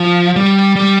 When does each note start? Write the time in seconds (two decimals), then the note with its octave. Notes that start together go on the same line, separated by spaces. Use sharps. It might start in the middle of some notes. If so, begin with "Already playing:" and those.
Already playing: F3
0.36 G3
0.76 G3